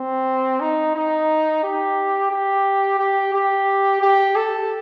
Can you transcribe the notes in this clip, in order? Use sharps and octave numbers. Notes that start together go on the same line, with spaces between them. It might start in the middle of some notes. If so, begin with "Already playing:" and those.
Already playing: C4
D#4
D#4
G4
G4
G4
G4
G4
A4